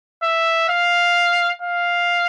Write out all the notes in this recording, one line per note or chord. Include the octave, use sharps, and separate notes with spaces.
E5
F5
F5